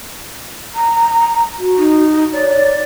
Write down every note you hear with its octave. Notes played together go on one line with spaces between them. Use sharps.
A#5
F#4
D#4
C#5 D5